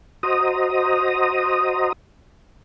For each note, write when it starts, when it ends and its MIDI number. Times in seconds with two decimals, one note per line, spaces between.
0.23 1.92 66
0.23 1.92 72
0.23 1.92 75
0.23 1.92 82
0.23 1.92 87